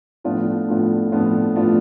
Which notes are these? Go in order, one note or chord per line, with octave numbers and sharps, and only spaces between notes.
A2 F3 B3 D4 F4
A2 F3 B3 D4 F4
A2 F3 B3 D4 F4
A2 F3 B3 D4 F4